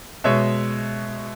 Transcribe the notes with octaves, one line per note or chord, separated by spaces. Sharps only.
B2 G#3 C#5 E5